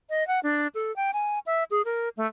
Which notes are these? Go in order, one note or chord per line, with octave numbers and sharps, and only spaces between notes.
D#5
F#5
D4
A4
G5
G#5
E5
G#4
A#4
A3